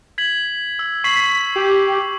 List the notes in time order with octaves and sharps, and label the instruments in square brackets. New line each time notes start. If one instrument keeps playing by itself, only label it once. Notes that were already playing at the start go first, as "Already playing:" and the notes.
[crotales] G#6 B6 F#7
E6
[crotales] C#6 C7 F#7 [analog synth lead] B6
[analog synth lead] G4